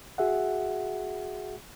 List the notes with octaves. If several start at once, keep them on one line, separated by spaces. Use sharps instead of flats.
F#4 G#4 E5 F#5